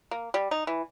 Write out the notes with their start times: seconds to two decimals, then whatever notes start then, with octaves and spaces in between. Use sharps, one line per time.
0.11 A#3
0.34 G3
0.51 D#4
0.67 E3